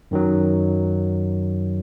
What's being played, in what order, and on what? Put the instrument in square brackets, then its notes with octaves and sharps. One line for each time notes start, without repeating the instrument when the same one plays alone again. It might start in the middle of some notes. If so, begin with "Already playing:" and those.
[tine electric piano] F#2 D#3 F#3